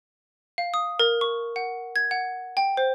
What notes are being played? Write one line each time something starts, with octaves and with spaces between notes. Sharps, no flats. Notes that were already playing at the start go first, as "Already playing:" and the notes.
F5
D#6
A#4
C#6
F#5
G#6
F#5
G5
C5